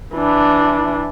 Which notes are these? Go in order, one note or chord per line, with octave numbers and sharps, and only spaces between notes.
E3 D4